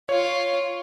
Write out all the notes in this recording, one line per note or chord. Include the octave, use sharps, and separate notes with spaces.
F4 C#5